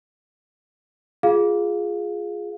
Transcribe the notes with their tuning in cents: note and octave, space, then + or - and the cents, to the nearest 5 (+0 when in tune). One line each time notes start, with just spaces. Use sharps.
F4 +0 G#4 +0 F5 +10